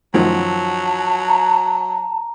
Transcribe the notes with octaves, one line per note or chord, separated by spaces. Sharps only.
F#2 D#3 F3 F#3 A5
A#5